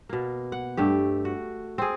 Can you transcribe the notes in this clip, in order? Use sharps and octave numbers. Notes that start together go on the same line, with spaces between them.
B2 A#3
F#5
G2 A3 G4
F#4
C4 G#4